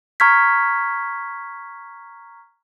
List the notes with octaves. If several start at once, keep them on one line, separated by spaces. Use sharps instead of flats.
A#5 C#6 F6 G#6 B6